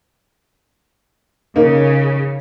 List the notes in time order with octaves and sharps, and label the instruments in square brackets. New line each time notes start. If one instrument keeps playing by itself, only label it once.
[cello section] C#3 [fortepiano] A#3 D#4